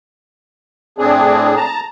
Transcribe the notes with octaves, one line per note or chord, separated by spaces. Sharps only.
A2 C4 D4 G#4
A5 A#5